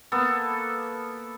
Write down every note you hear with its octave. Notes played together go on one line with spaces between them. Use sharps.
A#3 B3 A4